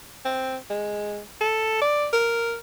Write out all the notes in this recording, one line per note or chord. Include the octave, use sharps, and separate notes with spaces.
C4
G#3
A4
D5
A#4